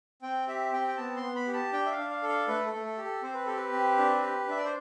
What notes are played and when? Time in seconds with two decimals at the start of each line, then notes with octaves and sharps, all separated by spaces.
0.22 C4 G5
0.47 G4 E5
0.73 C4 G5
0.88 G5
0.97 B3 A5
1.17 C6
1.23 B3
1.36 B5
1.47 G4
1.54 A5
1.72 D4 G5
1.86 E5
1.91 F5
1.98 D4
2.10 F5
2.23 A4
2.29 F5
2.48 A3 B4
2.67 A4
2.73 A3
2.85 A4
2.98 G4
3.04 A4
3.22 C4 C5
3.34 B4
3.46 G4 A4
3.57 B4
3.72 C4
3.98 D4
4.22 G4
4.48 D4 E5
4.57 D5
4.65 C5